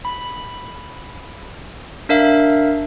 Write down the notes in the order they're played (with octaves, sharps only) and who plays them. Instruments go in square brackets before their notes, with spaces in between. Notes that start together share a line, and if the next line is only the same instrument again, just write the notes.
[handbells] B5
D4 A#4 E5 F5